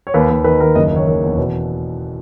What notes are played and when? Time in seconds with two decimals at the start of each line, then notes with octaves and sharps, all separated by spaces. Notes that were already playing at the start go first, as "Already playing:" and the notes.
0.07 C#5
0.14 D#2 B4
0.30 D#2
0.44 D#3 B4
0.60 D#2 A#4
0.75 F#1 D#5
0.91 D#3 C#5
1.07 D#3
1.22 E2
1.33 C#5
1.37 B2 B4